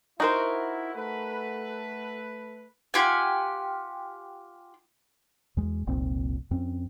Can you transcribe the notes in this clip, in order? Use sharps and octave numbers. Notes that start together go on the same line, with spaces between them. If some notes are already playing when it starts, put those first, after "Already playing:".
D#4 E4 F#4 A#4 C5
A3 A4 B4
F4 G4 F#5 G#5
E2 G#3
F1 C2 A#2 C4
F2 C4 C#4